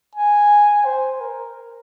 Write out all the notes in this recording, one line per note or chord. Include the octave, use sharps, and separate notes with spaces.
G#5
C5
A#4